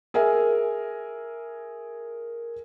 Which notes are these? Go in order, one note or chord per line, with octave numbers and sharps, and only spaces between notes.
G#4 A#4 E5 G#5